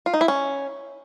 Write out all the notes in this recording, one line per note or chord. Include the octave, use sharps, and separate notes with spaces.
F4
D#4
E4
C#4